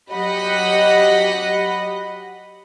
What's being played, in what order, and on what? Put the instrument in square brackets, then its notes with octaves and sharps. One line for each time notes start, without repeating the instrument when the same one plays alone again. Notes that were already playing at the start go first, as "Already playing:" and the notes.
[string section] F#3 G4 D#5 F#5 B5